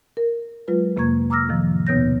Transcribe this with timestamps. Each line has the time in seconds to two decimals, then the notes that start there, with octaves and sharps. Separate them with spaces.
0.17 A#4
0.68 F#3 G#3 F4 B4
0.96 F2 C3 A#3 A#5 C#6 G#6
1.30 A#5 D6 E6 F6 A#6
1.48 A2 C3 D#3 F3
1.87 D#2 B2 B3 C#5 G6 A#6